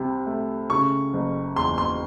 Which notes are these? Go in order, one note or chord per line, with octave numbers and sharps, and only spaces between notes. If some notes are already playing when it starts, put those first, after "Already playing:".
Already playing: C2 C3
A3
C#3 C#6
F#1
E2 C6
C6